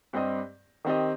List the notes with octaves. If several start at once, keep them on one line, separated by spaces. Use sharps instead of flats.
G2 G3 C4 G4 D#5
D#3 C4 G4 D#5